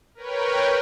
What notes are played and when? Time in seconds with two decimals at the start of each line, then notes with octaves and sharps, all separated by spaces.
0.15 A#4 B4 C#5 G5